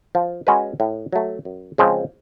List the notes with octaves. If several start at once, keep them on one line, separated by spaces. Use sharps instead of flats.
F3
G#3 C#4 F#4 B4
A2
F#3 A3
F#2
C#3 F3 G#3 C4